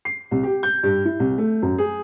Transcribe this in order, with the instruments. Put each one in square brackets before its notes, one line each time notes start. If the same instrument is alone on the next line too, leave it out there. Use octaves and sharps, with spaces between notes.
[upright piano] C7
C2
G4
G6
G2
E4
C2
A3
F#2
G#4